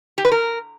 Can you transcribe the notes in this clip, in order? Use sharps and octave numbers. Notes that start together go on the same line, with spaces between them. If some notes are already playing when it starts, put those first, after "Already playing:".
G4
B4
A#4